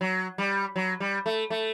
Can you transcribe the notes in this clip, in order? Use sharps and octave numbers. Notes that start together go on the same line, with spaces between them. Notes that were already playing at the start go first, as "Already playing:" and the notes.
F#3
G3
F#3
G3
A3
A3